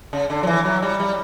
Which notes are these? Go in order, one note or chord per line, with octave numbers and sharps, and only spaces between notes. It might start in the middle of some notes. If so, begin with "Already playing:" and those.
C#3
D3
F#3
E3
F#3
G3
G3